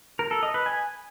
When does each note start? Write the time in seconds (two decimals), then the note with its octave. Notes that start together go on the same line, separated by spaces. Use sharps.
0.19 A#4
0.31 A4
0.43 D#5
0.54 B4
0.66 G#5